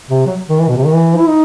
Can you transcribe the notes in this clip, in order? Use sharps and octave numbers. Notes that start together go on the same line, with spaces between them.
C3
F#3
D#3
E3
B2
C3
D#3
E3
E4
D#4